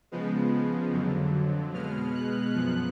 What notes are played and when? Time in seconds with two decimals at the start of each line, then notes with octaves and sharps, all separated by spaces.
0.12 C#3 F3 G#3 B3
0.93 F2 D3 F#3
1.74 B2 G#3 B3 F6
2.15 F#6
2.54 F#2 F3 B3 F#6